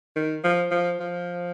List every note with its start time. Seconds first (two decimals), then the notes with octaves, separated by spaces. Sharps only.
0.16 D#3
0.44 F3
0.71 F3
1.00 F3